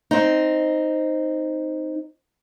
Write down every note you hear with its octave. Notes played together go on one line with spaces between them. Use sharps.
C4 D#4